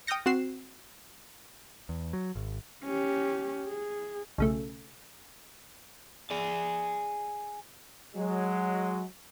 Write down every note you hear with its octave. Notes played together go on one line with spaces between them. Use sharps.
G5 D#6 F6 G6 A#6 C#7
C4 F#4 F#6 C7 E7
E2
F#3
G#1
C#4 G4
G#4
B1 C#3 A3
G#4 D5
F#3 G#3